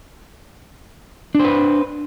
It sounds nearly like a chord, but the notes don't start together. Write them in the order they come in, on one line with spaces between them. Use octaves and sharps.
D4 C5 B4